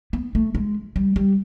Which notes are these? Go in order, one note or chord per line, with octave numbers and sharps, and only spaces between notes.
B3
A3
G#3
G3
G3